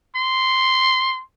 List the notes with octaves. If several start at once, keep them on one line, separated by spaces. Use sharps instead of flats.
C6